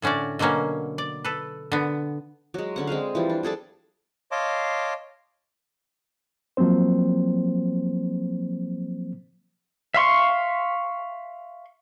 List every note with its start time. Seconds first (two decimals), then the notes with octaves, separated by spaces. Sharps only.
0.02 A2 D3 C#4 F#4 D5
0.39 B2 D3 F#3 A#3 C#4
0.98 D5
1.24 A4 B4
1.72 D3 B3
2.54 F#3 G#3
2.76 D3 C#4 F#5
2.87 G#3 C4 G#4 F5
3.15 E3 F3 G3
3.29 D4
3.43 G3 G#4 A4 D5
4.32 C#5 D#5 F5 A5 C6 D6
6.57 F3 F#3 A#3 C4 C5
9.94 E5 F5 C6 C#6